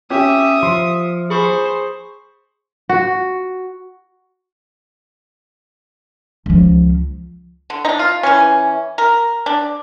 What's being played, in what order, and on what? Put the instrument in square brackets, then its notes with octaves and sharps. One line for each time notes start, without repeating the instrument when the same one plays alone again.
[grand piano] C#4 G4 [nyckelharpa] E5 D#6
[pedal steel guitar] F3 [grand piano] C6
[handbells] G#4 B5 C#6 [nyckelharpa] C5
[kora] F#4
[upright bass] C#2 F3
[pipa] D3
D4 D#4
F4
E3 C#4
A#4
D4